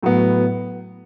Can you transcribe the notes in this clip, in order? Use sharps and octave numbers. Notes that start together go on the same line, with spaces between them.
A2 F#3 B3